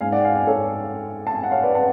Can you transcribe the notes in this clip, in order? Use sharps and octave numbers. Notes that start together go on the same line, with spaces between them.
G#2 F5 G#5
D5 F#5
F5 G#5
F5 G#5
A4 C#5
A5
G#5
F#5
C#5 F5
B4 D5
F#5 A5